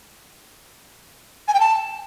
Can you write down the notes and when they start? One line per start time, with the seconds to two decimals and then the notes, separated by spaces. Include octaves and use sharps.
1.48 G#5
1.54 G5
1.60 A5